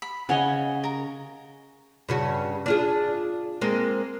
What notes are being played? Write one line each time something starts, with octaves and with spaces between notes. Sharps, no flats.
B5
C#3 C#5 D#5 F#5 G#5
A#4 A#5
G2 C#3 F#4
D4 F4 G#4
G#3 A#3 C4